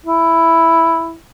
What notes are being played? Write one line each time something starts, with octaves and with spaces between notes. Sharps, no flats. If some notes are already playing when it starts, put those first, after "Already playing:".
E4